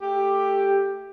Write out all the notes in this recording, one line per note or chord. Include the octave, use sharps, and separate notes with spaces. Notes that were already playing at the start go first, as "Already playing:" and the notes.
A3 G4